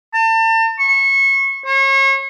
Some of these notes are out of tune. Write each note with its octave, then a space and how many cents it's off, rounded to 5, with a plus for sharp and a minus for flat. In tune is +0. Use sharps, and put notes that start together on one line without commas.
A5 +40
C#6 -25
C#5 -35